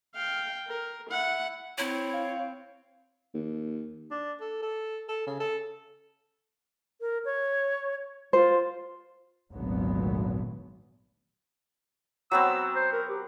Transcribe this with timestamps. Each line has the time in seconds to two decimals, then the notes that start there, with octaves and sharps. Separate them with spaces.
0.15 F5 G5
0.67 A#4
1.10 E4 F#5
1.78 C4 E4 C#5
2.13 F5
3.34 D#2
4.11 D4
4.40 A4
4.62 A4
5.08 A4
5.27 C#3
5.40 A4
7.01 A#4
7.25 C#5
8.33 F4 C5
9.52 G#1 D2 A#2 F#3 B3
12.31 F#3 B3 C4 E6
12.76 C5
12.93 A#4
13.09 G4